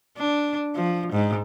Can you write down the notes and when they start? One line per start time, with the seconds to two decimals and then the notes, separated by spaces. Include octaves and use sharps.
0.17 D4
0.75 F3
1.13 G#2